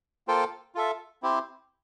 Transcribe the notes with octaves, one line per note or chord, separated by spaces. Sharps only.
A#3 F4 A4 C5 G5
F4 A4 E5
C4 E4 G4 C5